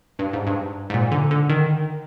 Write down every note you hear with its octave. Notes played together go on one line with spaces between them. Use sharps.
G2
G#2
G2
G#2
A#2
D3
D3
D#3